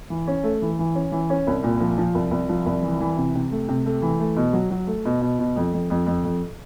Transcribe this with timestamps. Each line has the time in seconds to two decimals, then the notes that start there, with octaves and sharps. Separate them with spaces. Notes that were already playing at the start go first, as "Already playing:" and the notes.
0.10 E3
0.27 C#4
0.44 A3
0.62 E3
0.79 E3
0.95 C#4
1.12 E3
1.30 C#4
1.47 C2
1.63 A#2
1.80 F3
1.98 F3
2.15 C2
2.31 C2
2.49 F3
2.66 C2
2.82 E3
3.00 E3
3.17 C3
3.35 C3
3.51 A3
3.68 C3
3.86 A3
4.02 E3
4.20 A3
4.36 B2
4.53 F#3
4.70 F#3
4.87 A3
5.05 B2
5.21 B2
5.39 B2
5.56 F2
5.73 F2
5.90 F2
6.06 F2
6.24 F2